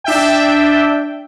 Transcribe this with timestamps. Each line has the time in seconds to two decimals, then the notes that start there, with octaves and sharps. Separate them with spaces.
0.04 D4 E5 G5